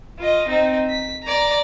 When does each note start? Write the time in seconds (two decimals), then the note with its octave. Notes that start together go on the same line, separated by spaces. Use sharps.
0.19 F4 D#5
0.48 C4 D#4
0.90 B6
1.23 D5 A#5